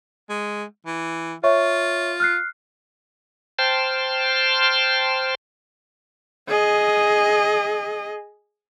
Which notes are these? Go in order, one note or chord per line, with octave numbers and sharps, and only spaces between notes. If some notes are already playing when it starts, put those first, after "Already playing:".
G#3
E3
F4 C#5 E5 C#6
F6 F#6 C7
C5 G5 A5 C6 F6
G#4 D#5